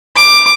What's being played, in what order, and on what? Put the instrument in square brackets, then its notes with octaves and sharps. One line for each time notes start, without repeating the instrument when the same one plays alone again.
[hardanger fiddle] D6